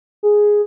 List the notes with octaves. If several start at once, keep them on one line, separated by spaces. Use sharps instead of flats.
G#4